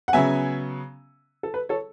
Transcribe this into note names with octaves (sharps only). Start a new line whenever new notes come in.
F#5
C#3 F#3 B3 E5 G#5
A4
B4
A4 C#5